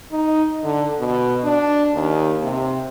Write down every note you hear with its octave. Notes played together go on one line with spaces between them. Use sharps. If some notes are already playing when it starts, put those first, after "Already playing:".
D#4
D3
B2
D4
D#2
C3